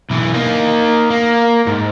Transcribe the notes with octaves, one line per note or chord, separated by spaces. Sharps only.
B1 E3
A#3 D#4
A#3
G#2